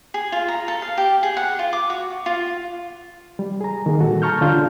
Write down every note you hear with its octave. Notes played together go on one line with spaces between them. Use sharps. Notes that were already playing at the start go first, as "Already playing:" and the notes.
G#4
F4
A#5
A4
F5
G4
G#4
F#5
F4
D6
F#4
F4
G3
G#4 A#5
D#3 A#3 G#4
A#2 G3 F#4 A4
A5 A#5 C#6 F6 G6
D3 C#4 F4 F6 G6